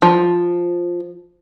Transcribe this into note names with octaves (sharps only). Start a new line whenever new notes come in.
F3